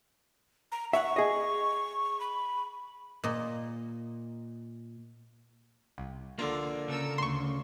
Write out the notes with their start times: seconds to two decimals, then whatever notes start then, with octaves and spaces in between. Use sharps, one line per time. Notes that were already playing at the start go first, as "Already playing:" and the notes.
0.72 A#5
0.93 E5 F#5 C#6
1.16 G#4 D#5
2.20 B5
3.24 A#2 D#5
5.98 C2
6.39 D3 A#3 D4 F4
6.88 C#3 A4 A#4 E6
7.18 D2 C6 C#6